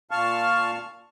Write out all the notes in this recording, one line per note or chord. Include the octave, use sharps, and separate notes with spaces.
A#2 F5 A5 C#6 F6